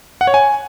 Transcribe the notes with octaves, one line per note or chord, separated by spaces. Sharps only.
F#5
C#5
G#5